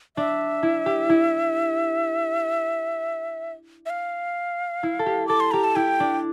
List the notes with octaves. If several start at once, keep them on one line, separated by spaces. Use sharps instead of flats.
D4 E5
E4
G4
E4
E5
F5
E4
A4
G4
A4 D6
C6
G4 A#5
A5
E4 G5
D4